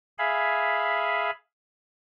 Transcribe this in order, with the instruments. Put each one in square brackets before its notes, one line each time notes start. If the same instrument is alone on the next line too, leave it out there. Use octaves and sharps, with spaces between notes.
[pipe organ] G#4 E5 F5 G#5 B5